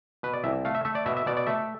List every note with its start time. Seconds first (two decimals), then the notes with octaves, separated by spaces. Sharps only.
0.23 B2 B4
0.33 D5
0.44 C2 E5
0.65 A3 F5
0.75 E5
0.85 A3 E5
0.95 D5
1.06 B2 E5
1.17 E5
1.26 B2 D5
1.37 D5
1.47 A3 E5